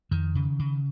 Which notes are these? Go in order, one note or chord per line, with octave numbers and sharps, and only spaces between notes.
F2 D#3
C#3
C#3